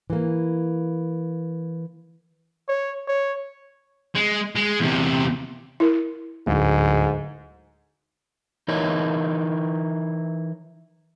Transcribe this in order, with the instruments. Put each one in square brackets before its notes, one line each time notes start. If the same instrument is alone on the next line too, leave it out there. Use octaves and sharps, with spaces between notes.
[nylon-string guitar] E3 A#3
[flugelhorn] C#5
C#5
[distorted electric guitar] G#3
G#3
E2 C3
[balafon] E4 A#4
[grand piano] D1 [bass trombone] G#2
[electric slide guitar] E3 D#4 E4 A#4 C#5 D#5